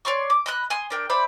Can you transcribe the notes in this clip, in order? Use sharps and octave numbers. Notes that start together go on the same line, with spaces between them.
C#5 D5 C6 C#6
D6
D#5 B5 F#6
G#5 C6 D#6
D4 A#4 G5
C5 D5 E5 B5